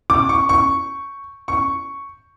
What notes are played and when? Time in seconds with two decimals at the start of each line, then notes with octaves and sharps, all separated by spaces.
0.10 D6
0.29 C#6
0.49 C#6
1.48 C#6